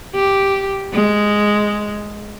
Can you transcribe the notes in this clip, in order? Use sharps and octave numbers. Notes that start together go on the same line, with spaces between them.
G4
G#3